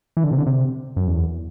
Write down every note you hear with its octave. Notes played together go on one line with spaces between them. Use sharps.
E3
D3
C3
D3
C3
F#2
E2